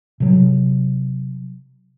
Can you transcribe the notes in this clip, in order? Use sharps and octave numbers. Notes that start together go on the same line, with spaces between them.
C3 F#3